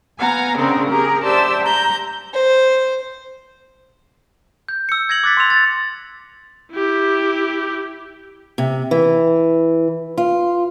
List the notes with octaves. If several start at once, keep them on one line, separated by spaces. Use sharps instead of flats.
B3 F5 F#5 G#5 A#5
C#3 C4 D4 G#4 A#4
G4 G#4 A#4 A#5
G4 C5 D5 E5 A5 E6
A#5 G6
C5
G6
E6 C#7
G#6 A#6 C#7 F#7
D6 F#6 A6 B6
C6 E6 F7
A6
E4 G4
C3
E3
F4